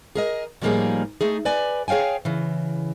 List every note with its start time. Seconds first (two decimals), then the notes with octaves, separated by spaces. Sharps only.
0.15 G#4 A#4 D#5
0.62 A2 F3 G3 A#3 D#4 G#4
1.21 A3 D#4 G#4
1.45 B4 D5 G#5
1.88 G#4 C#5 F5 G5 G#5
2.25 C#3 E3